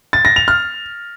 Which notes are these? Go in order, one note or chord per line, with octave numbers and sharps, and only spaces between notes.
A6
A#6
F7
F6